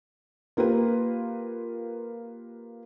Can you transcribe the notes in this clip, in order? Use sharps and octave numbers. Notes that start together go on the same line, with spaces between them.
A#3 F4 G4 A#4 B4